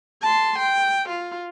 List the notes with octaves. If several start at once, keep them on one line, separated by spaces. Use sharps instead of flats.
A5 C6
G5
F4